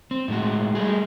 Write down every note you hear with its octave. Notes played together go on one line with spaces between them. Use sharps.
C4
A2 G#3 F#4
G3 A3 G#4